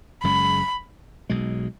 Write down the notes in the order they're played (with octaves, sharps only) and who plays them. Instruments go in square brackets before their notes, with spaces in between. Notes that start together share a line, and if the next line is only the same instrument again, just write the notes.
[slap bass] F#1 F#2 C#3 G#3 [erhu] B5
[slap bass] B1 B2 G#3